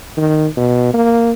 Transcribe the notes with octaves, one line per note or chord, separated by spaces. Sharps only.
D#3
B2
A#3